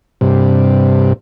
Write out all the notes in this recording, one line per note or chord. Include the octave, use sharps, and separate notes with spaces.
G2 C3